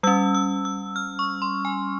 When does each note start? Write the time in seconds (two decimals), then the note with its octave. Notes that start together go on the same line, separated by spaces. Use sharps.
0.03 G3 C#4 E6
0.35 E6
0.65 E6
0.96 F6
1.19 C#6
1.42 C6
1.65 G#5